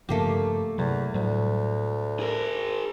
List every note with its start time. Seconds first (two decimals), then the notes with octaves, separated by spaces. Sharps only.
0.09 G2 C#3 F3 A3 A#3 G4
0.78 E2 C3 F#3
1.14 D2 A2 F#3 G3
2.20 G#4 A#4